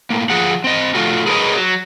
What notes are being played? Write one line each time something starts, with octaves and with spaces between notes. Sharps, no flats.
A2 A#3
F3 G#4 F#5
C4 D#5
F3 A3 F4 F#4
G#4 A#4 B4 C#5 D#5
F#3